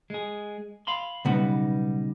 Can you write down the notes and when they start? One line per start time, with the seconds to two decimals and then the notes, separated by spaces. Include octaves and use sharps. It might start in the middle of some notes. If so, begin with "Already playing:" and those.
0.10 G#3 G#4
0.87 F5 B5 C6
1.25 B1 C#3 G3 B3 D#4